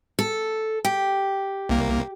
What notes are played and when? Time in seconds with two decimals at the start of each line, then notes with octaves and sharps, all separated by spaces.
0.19 A4
0.85 G4
1.69 C2 A#3